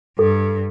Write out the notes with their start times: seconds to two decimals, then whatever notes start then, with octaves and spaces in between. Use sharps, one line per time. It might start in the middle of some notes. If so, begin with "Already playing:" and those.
0.19 G2 A4